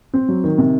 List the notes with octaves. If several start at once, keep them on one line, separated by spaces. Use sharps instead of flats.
C4
F#3
D#3
C3